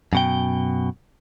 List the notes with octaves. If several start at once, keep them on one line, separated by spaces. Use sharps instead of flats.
F#2 B2 G5